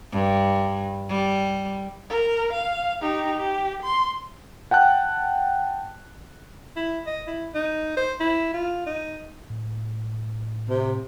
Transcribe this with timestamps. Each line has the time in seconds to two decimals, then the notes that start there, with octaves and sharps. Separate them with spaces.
0.12 G2
1.09 G3
2.10 A#4
2.53 F5
3.02 D#4 G4
3.37 G4
3.83 C6
4.71 F#5 G5 A5 F#6
6.77 E4
7.07 D#5
7.27 E4
7.55 D#4
7.97 C5
8.20 E4
8.54 F4
8.87 D#4
9.50 A2
10.69 C3